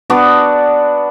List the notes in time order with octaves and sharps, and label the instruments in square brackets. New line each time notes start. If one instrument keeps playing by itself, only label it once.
[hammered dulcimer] B3 D4 F#4 D5